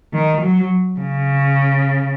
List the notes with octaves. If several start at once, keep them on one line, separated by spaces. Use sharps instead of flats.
D#3
F#3
C#3